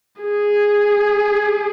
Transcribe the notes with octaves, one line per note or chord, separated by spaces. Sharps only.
G#4